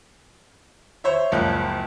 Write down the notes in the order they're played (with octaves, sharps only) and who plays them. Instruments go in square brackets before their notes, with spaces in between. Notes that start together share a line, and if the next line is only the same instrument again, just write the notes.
[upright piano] C5 C#5 E5
F#1 C#2 F3 F4 F#6